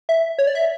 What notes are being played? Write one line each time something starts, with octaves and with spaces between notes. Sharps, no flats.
E5
C#5
D5
E5